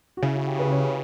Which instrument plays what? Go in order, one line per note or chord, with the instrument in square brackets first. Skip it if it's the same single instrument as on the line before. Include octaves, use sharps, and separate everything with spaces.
[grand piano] F#4
[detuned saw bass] C#3 [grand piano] E4
[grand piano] F#4
G4
B4
C#5